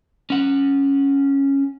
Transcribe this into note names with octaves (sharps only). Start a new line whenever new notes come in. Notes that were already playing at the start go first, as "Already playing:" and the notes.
C#4 F#5